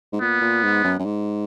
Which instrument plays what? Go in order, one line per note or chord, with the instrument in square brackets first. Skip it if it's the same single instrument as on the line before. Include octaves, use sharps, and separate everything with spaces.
[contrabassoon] G#2
[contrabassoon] A#2 [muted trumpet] B3
[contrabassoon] A#2
G#2
F#2
F#2
G#2